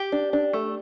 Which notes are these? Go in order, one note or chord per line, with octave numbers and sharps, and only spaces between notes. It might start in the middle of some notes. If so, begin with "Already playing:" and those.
Already playing: G4
D4
D4
A3